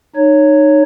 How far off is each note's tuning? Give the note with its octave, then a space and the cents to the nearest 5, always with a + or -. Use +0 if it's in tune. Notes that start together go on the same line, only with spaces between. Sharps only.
D#4 -25 C#5 +0